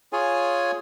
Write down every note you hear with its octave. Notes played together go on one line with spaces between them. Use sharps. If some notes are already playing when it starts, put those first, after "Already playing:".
F4 G#4 C#5 G#5